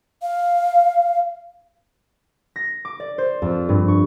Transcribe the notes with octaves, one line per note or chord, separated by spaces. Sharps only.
F5
A#6
D6
D5
C5
F2
G2
C#6